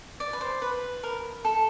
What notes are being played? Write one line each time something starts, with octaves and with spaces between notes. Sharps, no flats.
D5
B4
C5
B4
A#4
A4